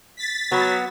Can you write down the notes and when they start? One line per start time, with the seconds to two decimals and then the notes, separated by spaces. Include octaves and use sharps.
0.17 A6 B6
0.52 F#3 B3